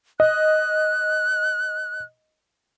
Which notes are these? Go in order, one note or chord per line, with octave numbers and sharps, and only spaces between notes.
D#5 F#6